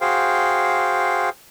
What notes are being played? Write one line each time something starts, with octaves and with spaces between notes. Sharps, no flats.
F#4 G#4 C5 F5 G5